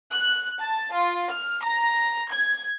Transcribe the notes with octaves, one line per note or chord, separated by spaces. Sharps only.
F#6
A5
F4
F6
A#5
G#6